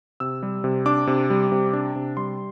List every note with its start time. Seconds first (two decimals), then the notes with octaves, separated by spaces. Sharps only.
0.20 C3 E6
0.43 G3
0.64 C3
0.86 D4 D6
1.07 C3
1.30 G3
1.52 C3
1.73 D4
1.96 C3
2.17 G3 C6